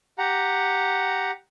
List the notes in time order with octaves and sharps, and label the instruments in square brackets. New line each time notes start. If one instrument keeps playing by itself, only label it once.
[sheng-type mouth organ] G4 F#5 A#5